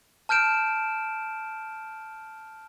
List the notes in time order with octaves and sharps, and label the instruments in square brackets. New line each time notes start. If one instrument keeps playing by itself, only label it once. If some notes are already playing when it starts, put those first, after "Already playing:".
[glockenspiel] A5 F6 G6 D7 E7